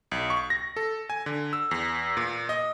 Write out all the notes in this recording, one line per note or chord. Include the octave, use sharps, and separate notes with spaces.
B1
C#6
A#6
A4
G#5
D3
E6
E2
A#2
D#5